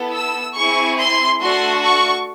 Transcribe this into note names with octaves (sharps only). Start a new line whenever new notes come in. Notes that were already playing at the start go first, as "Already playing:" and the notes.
Already playing: B3 E4 A4
E6
C4 E4 G#4 C#6
C6
A3 D4 F#4 A4 C6
C#6